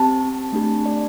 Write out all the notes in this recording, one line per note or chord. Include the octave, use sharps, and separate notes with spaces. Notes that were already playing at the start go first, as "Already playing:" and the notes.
Already playing: C4 G4 A5
A3 D4 G4
D5